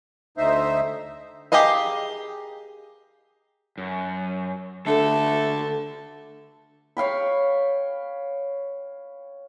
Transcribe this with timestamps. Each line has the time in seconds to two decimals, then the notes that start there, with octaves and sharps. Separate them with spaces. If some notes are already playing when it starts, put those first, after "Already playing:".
0.38 D2 D#4 C5 E5
1.52 G4 G#4 A#4 D#5 F5
3.78 F#2
4.87 D3 A3 A4
6.97 C#5 F5 G5 B5